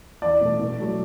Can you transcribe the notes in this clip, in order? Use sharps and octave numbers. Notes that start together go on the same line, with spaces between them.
E2 D5
B2 A3
B2
F#3 A3